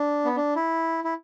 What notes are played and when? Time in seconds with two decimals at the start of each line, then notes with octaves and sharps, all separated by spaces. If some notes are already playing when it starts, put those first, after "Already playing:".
Already playing: D4
0.25 B3
0.36 D4
0.56 E4
1.04 E4